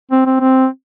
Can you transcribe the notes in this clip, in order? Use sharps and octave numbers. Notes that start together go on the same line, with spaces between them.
C4
C4
C4